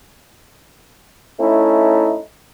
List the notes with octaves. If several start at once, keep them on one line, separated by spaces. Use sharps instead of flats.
A3 C#4 D#4 E4